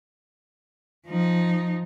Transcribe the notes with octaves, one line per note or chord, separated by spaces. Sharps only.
F3 D#4